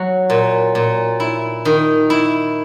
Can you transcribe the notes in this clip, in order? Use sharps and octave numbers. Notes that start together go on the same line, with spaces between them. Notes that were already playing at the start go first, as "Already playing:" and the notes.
Already playing: F#3
A#2
A#2
E4
D#3
E4